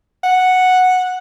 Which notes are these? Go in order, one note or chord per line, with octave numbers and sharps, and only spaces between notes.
F#5